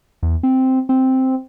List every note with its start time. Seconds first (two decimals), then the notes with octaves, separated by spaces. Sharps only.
0.23 E2
0.43 C4
0.89 C4